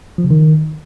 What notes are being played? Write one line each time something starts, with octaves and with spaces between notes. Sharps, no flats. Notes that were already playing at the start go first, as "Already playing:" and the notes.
F3
C#3
D#3